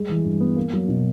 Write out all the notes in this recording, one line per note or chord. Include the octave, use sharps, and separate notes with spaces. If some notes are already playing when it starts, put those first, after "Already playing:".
Already playing: G3 G#3
E3
G2
B3
A#3
F#3
B2